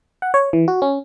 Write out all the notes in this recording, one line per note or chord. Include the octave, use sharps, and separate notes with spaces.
F#5
C#5
E3
F#4
C#4